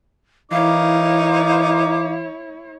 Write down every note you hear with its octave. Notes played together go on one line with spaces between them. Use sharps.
E3 D#4 E4 A#4 C#5 F5 D6